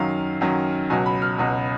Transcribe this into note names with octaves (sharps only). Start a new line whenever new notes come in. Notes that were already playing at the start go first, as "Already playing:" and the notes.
Already playing: F#2 D#3 F#3 F5
F#2 D#3 F#3
C#2 B2 F#3 G#5
B5
F6
C#2 B2 F#3